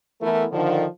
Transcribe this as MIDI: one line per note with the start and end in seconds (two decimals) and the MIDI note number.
0.21 0.45 52
0.21 0.45 57
0.21 0.45 59
0.21 0.45 64
0.21 0.45 69
0.21 0.45 70
0.52 0.85 50
0.52 0.85 51
0.52 0.85 53